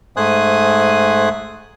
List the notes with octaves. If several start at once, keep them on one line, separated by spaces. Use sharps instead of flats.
G#2 A3 C5 G#5 D#6 F#6